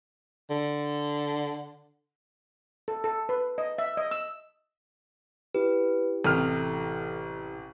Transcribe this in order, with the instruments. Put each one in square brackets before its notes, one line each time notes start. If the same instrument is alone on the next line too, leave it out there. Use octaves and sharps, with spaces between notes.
[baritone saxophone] D3
[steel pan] A4
A4
B4
D#5
E5
D#5
E6
[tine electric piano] E4 G4 [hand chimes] B4
[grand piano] A1 C3 F6 [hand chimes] A4